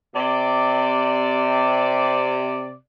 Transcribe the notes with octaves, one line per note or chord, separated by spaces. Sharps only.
C3 D5